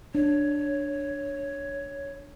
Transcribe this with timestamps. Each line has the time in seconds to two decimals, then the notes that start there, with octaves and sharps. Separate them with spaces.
0.15 D4 C#5